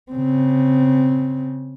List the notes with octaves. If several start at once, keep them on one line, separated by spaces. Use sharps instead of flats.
C#3 C4